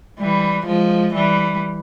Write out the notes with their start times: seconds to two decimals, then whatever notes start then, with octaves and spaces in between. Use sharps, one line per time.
0.19 E3 G3
0.66 F3 G#3
1.14 E3 G3